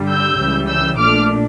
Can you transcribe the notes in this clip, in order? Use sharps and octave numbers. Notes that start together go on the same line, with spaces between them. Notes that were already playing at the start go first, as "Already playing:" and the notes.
Already playing: G2 D3 G3
E6 G6
C#2 C#3 E3 G3
E6 G6
A#1 A#2 A3 D4 D6 F6